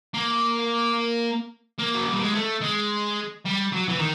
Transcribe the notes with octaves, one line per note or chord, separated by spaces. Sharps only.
A#3
A#3
F#3
G3
G#3
A3
G#3
G3
F#3
E3
D#3